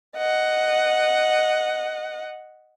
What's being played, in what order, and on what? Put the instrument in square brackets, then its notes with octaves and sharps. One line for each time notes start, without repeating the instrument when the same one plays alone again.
[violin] D#5 F#5